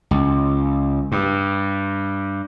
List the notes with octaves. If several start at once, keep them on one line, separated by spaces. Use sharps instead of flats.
C#2
G2